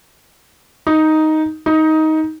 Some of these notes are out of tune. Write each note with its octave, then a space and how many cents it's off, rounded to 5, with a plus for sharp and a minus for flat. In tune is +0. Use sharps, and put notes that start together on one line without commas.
D#4 +5
D#4 +15